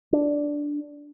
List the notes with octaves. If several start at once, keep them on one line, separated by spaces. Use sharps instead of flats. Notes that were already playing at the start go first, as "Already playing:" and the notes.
D4